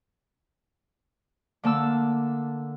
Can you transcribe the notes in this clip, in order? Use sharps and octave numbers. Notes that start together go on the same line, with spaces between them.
D3 A#3 A5 E6